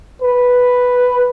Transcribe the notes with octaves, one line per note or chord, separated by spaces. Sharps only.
B4